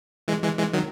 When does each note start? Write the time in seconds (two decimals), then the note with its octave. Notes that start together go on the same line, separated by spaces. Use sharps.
0.28 E3 G#3
0.43 E3 G#3
0.58 E3 G#3
0.73 D#3 F#3